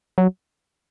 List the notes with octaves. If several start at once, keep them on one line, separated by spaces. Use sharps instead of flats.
F#3